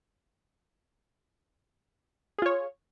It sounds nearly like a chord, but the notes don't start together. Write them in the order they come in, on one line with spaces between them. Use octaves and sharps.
G#4 F4 C#5